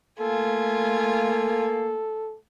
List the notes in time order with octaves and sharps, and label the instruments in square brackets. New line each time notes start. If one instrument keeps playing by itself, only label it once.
[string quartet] A3 F4 G#5 [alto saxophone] A#3 [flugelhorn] A4